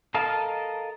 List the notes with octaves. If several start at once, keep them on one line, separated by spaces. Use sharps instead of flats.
A4 A#4 D#5 F5 A5